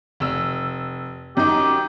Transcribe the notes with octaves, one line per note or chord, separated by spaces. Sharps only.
F1 E6
F#2 D#4 G4